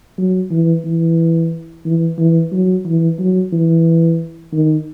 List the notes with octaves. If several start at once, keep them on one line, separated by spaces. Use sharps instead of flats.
F#3
E3
E3
E3
E3
F#3
E3
F#3
E3
D#3